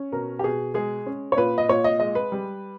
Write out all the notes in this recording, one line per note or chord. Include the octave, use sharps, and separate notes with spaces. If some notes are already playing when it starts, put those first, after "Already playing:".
Already playing: C#4
B2 A#4
G4
B2 G#4
G#3 G#4
C#4
C#5
A#2 B4
D#5
A#2 C#5
D#5
G#3 D#5
B4
G3